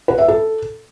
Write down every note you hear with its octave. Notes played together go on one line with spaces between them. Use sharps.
B4
E5
A4